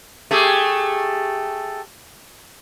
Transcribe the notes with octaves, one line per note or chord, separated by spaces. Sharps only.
A3 G4 G#4